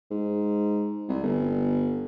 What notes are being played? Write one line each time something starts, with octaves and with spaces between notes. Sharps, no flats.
G#2
C2
G1